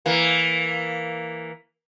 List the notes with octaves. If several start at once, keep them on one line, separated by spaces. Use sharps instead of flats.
E3 A#3